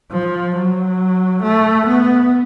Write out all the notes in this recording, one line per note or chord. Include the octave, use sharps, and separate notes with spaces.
F3
F#3
A3
B3